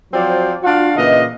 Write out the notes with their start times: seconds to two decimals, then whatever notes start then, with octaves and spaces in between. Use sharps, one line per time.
0.12 F3 F#3 C4 C5 D5
0.63 D4 F4 F#4 F5
0.96 A#2 C#3 E3 D#5